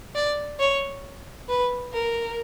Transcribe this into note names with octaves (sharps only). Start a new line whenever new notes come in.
D5
C#5
B4
A#4